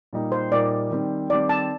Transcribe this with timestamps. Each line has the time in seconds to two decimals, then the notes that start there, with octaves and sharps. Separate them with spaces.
0.13 A#2 G3 A#3 D#4
0.32 C5
0.51 A#2 G3 A#3 D#4 D5
0.91 D#3 G3 C4
1.29 D#3 G3 C4 D5
1.49 A5